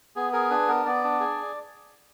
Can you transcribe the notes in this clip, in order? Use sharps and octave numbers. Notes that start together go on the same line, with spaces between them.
B3 G#4
G#4 A#4
D4 B4
B3 A#4
B3 D5
D4
G#4